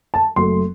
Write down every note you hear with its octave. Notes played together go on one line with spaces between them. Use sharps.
A5
F#1 F#2 F#3 A3 C6